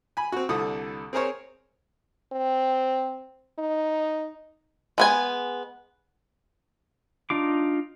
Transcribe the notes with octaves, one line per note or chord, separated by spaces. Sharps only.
G#5 B5
C4 F#4
C2 D3 E4 A4 D#6
C4 G#4 A#4 C5 C#5
C4
D#4
G#3 B3 G#5
D4 D#4 F4 D6